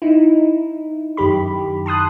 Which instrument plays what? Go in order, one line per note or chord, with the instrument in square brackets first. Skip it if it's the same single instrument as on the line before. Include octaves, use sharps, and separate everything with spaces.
[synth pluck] D#4 E4
F#2 D#3 G4 B5
A5 C6 D#6 F#6